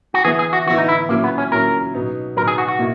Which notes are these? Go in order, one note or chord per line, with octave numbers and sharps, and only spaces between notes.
F#4
E3 B3 E4 G#4
G#4
F#4
E3 B3 E4 F#4
D#4
E4
A#2 F#3 A#3 C#4 E4
B3
C#4
A#2 F#3 C#4 E4 A#4
B2 F#3 B3 D#4
B2 F#3 B3 D#4 A#4
G#4
F#4
F#4
B2 A#3 E4